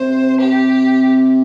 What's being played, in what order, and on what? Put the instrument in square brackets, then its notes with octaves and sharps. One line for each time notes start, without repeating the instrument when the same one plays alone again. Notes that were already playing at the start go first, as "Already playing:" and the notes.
Already playing: [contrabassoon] C3 [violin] C5
[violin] G4